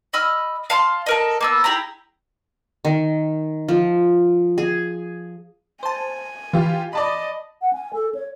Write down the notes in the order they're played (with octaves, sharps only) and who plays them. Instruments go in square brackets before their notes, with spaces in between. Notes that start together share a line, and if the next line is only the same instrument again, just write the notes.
[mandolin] D#5 B5 E6 F6
F5 A5 C6
A4 A#4 D#5
A#3 B3 E6
E4 G4 G#4 A#5
[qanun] D#3
F3
G#4
[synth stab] C5 A5 [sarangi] G#5
[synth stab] E3 [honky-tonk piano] F4 G4
[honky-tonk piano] D5 A5 B5 [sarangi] D#5
[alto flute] F#5
G#5
A4
C#5